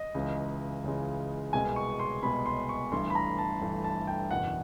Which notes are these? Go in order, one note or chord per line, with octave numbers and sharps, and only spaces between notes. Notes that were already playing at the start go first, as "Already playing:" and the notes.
Already playing: D#5
C#2 C#3 E3 G#3
C#2 C#3 E3 G#3
C2 B2 G#3 B3 G#5
C#6
C6
C2 B2 G#3 B3 B5
C6
C#6
G1 G2 E3 A3 C6
B5
A#5
A5
G1 G2 E3 A3
A5
G5
F#1 E2 B2 F#5